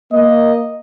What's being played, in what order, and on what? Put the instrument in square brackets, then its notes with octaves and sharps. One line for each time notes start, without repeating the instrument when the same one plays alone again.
[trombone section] A#3 [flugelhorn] D#5